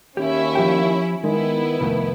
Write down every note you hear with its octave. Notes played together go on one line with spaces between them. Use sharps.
D#2 C#4 E4 G4 E5
F3 G4 G5
D#3 G#3 B3 E4
C2 F2 D#3 A3